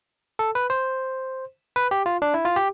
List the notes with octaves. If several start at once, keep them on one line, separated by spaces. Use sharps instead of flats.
A4
B4
C5
B4
G4
F4
D4
E4
F4
G4